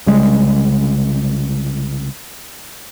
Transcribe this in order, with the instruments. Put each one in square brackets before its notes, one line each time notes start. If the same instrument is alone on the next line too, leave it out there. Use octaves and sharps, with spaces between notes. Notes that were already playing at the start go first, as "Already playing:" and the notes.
[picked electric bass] C2 C#3 G3 G#3